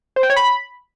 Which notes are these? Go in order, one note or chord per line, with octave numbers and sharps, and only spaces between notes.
C5
G5
C#5
B5